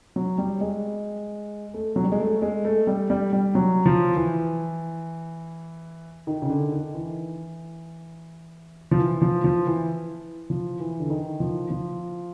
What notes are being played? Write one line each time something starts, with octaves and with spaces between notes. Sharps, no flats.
F#3
G3
G#3
A3
F#3
G3
G#3
A3
G#3
A3
G3
G3
G3
F#3
F3
E3
D#3
C#3
D3
D#3
E3
F3
E3
F3
F3
E3
F3
E3
D3
D#3
F3
F3